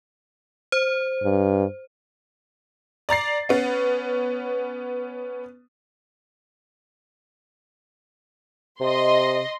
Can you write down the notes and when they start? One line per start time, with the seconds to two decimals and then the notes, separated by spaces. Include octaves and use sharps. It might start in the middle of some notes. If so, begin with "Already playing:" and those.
0.72 C5
1.24 G2
3.09 D5 A#5 A6 C7
3.49 B3 C#4
8.80 C3 D#5 C6